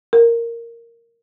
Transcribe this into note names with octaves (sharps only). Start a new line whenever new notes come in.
A#4